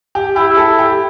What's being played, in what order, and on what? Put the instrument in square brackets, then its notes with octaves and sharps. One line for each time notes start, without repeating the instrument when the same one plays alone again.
[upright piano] G4
[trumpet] E4 [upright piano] G4
[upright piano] A4
G4